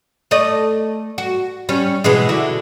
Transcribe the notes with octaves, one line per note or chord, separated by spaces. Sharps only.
A3 D5 D#5
F#4
G3 C#4
B2 E3 G#3
D3 E4 F#4